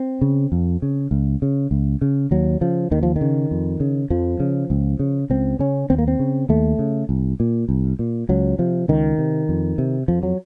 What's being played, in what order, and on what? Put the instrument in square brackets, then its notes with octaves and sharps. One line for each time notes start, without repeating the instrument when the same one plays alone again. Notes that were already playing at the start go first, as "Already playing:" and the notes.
Already playing: [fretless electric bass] C4
C#3
F2
C#3
C#2
C#3
C#2
C#3
D#2 F#3
C#3 F3
D#2 D#3
F3
D#3
C#3
F2
C#3
F2 F3
C#3
C#2
C#3
C#2 C4
C#3 C#4
D#2 C4
A#3
C4
C#3
D#2 A3
C#3
C2
A#2
C2
A#2
C#2 F#3
C3 F3
C#2 D#3
C3
F2
C3
F2 F3
F#3